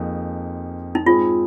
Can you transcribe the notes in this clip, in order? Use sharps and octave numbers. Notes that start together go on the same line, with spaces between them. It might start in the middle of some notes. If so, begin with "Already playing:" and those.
Already playing: F2 F3 A#3 D#4 G#4
D#4
G#2 G#3 C4 F4 G#4